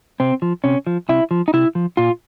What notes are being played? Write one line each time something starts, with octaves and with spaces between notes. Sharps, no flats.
C3 C4
F3
C3 C#4
F3
C3 E4
F3
D#4
C3 E4
F3
A#2 F4